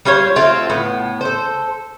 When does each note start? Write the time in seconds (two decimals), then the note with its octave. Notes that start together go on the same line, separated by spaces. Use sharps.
0.05 G3 F4 C5 C#5
0.36 A3 C4 F4
0.70 A2 B3
1.21 A4 C5